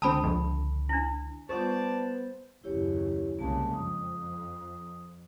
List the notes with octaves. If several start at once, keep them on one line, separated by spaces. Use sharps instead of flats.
C#2 D3 C4 G5 A5 B5 D#6
A#1 F2
D4 E4
G3 B3 F4 C5 D5 A5 C#6
F#1 D#2 C#3 E4 G4 C#5
C2 C#3 G#3 A#3 A5
F2 D#6